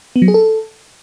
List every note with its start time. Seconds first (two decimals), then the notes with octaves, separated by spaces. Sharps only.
0.16 B3
0.22 F#3
0.28 G#4
0.34 A4